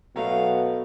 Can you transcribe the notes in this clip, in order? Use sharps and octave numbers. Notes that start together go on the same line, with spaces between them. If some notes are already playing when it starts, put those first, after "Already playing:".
B2 F#3 A3 F5